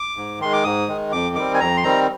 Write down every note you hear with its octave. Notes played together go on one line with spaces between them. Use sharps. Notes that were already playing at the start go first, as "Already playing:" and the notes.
Already playing: D6
G#2
D#3 G#3 C6
D6
G#2 D#6
D#3 G#3
F2 D6
D#3 G3 C4 D6
G#5
F2 A#5
C6
D#3 G3 C4 A#5